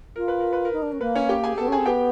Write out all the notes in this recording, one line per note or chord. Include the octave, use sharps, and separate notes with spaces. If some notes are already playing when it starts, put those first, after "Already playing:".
F4 A#4
B4
A#4
B4
A#4
D#4
D4
C#4
A#3 B4
C#4 C#5
G4 G5
G#4 G#5
B3 A4 A5
C#4
C4 G#4 G#5
B3 G4 G5